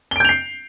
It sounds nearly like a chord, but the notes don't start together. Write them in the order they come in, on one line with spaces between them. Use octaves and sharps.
G7 D7 G6 F7 C7